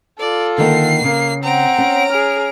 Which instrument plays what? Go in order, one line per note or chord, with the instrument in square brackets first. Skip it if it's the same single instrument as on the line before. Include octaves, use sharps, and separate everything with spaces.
[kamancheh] F4 A4 [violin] D5
[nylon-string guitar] D3 D#3 A#3 [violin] C7
[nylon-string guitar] C#3 [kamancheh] A#3
[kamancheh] C4 F#5 [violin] A#5 D7
[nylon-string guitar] C#4
[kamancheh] G#4 F6